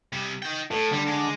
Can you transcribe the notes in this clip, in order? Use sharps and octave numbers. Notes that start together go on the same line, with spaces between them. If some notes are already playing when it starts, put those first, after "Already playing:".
C3 G3
D#4 G5
A2 A4
D3 G3
G#3